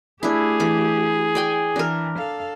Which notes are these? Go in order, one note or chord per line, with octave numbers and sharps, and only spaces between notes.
A3 D4 E4 G4 G#4
E3 D6
D5 G5 G#5
E3 D4 A#4
A4 F5